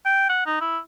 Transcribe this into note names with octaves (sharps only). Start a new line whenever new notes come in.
G5
F#5
D#4
E4